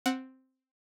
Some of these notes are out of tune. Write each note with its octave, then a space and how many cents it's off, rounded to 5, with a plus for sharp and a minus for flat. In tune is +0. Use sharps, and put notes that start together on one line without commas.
C4 +0 F#5 +0